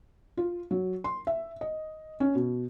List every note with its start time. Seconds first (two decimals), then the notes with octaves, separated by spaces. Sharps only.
0.37 F4
0.71 F#3
1.04 C6
1.27 E5
1.61 D#5
2.20 C#4
2.35 B2